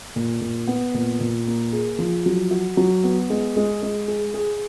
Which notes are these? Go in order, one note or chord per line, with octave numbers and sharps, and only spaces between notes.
A#2
A#2
B3
A#2
A#2
A#3
G#4
F3
F#3
F#4
F#3
B3
G#3
G#3
G#3
G#4
G#4